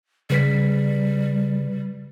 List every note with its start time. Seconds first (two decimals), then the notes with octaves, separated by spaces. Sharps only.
0.30 C#3 G3 B4 B6